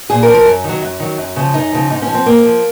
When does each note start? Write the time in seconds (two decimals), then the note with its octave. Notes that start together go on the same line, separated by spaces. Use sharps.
0.10 A#2 G#4
0.23 A#4
0.28 F3
0.34 A#4
0.46 F#2
0.64 D#3 F#3
0.82 F#2
1.00 D#3 F#3
1.18 F#2
1.36 C#3 F3
1.54 F#2 D#4
1.72 C#3 F3
1.90 G#2 D#4
2.02 C#4
2.08 F3
2.14 C4
2.26 G#2 A#3
2.44 F3